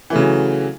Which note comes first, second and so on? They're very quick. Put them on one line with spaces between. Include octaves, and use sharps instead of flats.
E3 A3 C#3 F#3